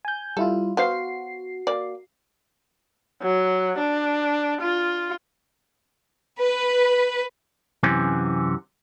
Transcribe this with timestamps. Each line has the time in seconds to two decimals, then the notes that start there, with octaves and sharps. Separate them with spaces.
0.05 G#5 G6
0.37 G3 E4 F4 A4
0.77 B3 F#4 C5 F5 C7
1.67 A#3 D5
3.22 F#3
3.78 D4
4.61 F4
6.38 B4
7.83 F#2 C3 E3 C4 C#4